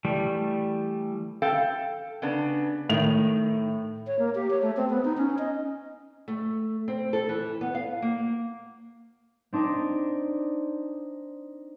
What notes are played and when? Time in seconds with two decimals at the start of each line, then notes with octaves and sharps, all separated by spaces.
0.05 E3 G3 A3
1.42 A4 F5 G5
2.22 C#3 B3 D4
2.89 A2 D#3 F7
4.07 C#5
4.19 A#3
4.35 G4
4.50 C#5
4.62 A3
4.77 C4
4.90 B3
5.05 D#4
5.17 C#4
5.38 D#5
6.28 A3
6.88 C4
7.13 A4
7.29 E3
7.61 B3
7.75 F5
8.02 A#3
9.53 C4 D4 D#4 D5